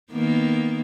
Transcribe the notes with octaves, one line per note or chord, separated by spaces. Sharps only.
D#3 A#3 B3